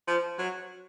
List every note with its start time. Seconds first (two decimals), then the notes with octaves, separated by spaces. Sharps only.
0.07 F3
0.38 F#3